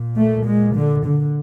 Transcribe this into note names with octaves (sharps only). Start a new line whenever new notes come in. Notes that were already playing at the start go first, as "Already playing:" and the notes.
Already playing: A#2
A3
G#3
D3
D3